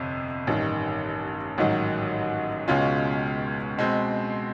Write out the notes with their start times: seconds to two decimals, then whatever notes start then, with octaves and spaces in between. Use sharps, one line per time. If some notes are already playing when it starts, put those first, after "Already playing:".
Already playing: G1 F2 C3
0.47 A1 G2 D#3
1.58 A1 G#2 D#3 F#3
2.68 C#2 B2 G#3 C#4 F4
3.78 B2 G#3 C4